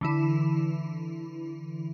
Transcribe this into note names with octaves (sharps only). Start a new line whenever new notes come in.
D3 E3 E4